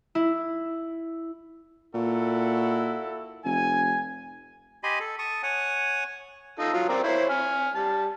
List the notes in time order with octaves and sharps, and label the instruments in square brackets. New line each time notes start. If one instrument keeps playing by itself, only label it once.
[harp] E4
[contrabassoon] A#2 [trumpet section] E4 F#4 A4
[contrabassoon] F1 [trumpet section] G#5
[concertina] G4 D#5 G#5 B5 C6
A4
A5 C#6 D#6
C#5 F#5 G#5
[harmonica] D#4 F4 A4
F#3 F4
C4 A#4 D5
E4 C5 C#5
G#5 F6
G3 A5